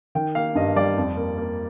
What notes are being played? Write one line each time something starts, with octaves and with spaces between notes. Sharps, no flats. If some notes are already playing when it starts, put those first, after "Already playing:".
D#3 G5
A#3 F5
G2 D#5
G3 D5
F2
A#3
A#3